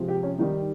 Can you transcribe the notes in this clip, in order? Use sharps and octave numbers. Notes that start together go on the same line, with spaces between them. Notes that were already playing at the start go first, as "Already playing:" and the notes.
Already playing: C3 F3 G#3
G4
C#4
G2 D#3 G3 D#4